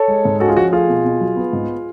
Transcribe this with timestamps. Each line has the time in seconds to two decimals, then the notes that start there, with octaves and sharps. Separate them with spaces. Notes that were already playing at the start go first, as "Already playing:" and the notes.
Already playing: A4 C#5
0.08 G#3
0.25 G#2
0.40 C#4 F#4 A4
0.48 F4 G#4
0.57 F3 F#4
0.72 A3 F4 G#4
0.88 B2
1.05 B2
1.21 F#3
1.36 B3
1.53 G#2